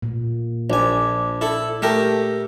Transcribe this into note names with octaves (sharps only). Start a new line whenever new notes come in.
A#2
A#1 D5 G#5
E4 A4
A3 G4 A#4